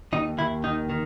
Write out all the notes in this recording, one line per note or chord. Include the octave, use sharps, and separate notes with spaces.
D#2 D#4
D#2 E4
D#3 D#4
D#3